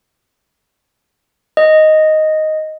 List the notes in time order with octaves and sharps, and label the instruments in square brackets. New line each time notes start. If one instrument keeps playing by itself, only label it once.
[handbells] D#5